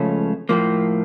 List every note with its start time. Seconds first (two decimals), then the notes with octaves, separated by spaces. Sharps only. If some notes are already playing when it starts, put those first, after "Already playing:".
Already playing: C#2 C#3 F3 A3 C#4
0.49 A2 F3 A#3